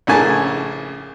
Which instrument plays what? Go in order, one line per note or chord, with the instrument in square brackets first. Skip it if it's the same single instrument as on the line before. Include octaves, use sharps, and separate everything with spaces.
[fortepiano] A#1 A2 C#3 A#3 G#5 A5